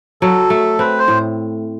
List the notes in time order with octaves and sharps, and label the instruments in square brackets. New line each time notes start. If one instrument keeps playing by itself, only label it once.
[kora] F#3 [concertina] A4
[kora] A3
[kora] C4 [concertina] B4
[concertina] C5
[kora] A2